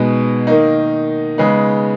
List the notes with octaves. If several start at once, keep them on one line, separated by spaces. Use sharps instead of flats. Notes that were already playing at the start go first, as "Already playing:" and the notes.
Already playing: B2 G#3 B3 D#4
D#3 A#3 D#4
C#3 G#3 B3 D#4